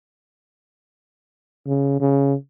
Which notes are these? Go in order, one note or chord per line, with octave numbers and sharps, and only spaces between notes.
C#3
C#3